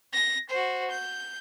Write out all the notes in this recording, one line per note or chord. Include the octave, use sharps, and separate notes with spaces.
A#6
F#4 C5
G6